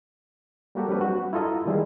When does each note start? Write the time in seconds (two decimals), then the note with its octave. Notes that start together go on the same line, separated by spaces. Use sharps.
0.75 G3 A#3 F#4 G4 A4
0.88 F#3 G3 C4 D4 B4
1.01 F#4
1.33 E4 F4 A4 D#5 A#5
1.66 D#3 E3 G3 G#3 E4 G#4